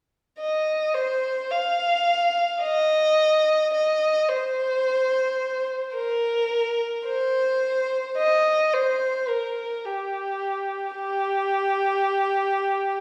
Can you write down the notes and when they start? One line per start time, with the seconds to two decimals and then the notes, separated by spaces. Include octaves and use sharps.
0.40 D#5
0.95 C5
1.51 F5
2.62 D#5
3.73 D#5
4.29 C5
5.95 A#4
7.06 C5
8.18 D#5
8.73 C5
9.29 A#4
9.85 G4
10.96 G4